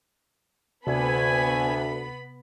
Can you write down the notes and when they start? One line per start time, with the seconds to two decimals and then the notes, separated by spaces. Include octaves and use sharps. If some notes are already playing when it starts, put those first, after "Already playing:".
0.87 D2 C3 B3 G#5 B5